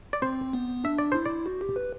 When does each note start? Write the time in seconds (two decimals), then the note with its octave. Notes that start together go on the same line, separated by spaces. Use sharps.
0.13 D5
0.22 C4 C5
0.53 B3
0.84 D4 E5
0.98 D5
1.12 E4 C5
1.25 D5
1.46 F#4
1.61 G4
1.76 B4